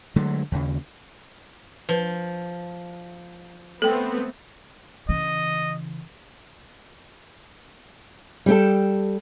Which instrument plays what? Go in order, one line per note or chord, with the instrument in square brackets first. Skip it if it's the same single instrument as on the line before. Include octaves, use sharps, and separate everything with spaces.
[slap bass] D3 F#3 G#3 A3
D#2 C#3
[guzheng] F3 [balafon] B4
[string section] A3 B3 C4 [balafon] A4 G5
[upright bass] C#3 E3 [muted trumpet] D#5
[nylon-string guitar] G3 G4 A4